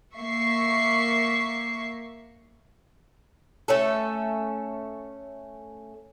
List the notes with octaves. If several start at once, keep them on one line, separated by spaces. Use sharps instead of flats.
A#3 E5 C#6 C7
A3 C#4 A4